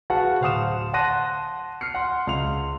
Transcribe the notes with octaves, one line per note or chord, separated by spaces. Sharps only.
F#4 G#4 B4 F5 F#5 A5
D1 C5 F5 F#5 D#6 E7
F#5 A5 C6 F#6 A#6 D#7
F6 C7 C#7
F#5 C6
C#2 F5 C6 F7